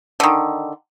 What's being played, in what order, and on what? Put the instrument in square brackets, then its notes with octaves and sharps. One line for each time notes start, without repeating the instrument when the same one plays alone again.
[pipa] D3 D#3